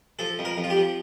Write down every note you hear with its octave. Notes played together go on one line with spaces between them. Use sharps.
F3 A4
F2
A#4
F2
F4
G4
F3